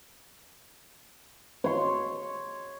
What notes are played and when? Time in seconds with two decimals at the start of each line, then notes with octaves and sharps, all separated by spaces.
1.64 C#5 C6